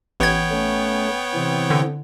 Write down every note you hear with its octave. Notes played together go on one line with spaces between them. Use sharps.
A1 B3 C#5 G5 G#6
A3 C#4
C3 E3 C4
D3